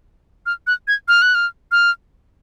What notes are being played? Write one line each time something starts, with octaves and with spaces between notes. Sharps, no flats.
F6
F#6
G#6
F6
F#6
F6
F6